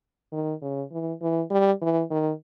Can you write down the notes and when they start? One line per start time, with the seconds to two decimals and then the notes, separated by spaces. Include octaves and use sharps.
0.33 D#3
0.62 C#3
0.92 E3
1.22 E3
1.51 G3
1.82 E3
2.11 D#3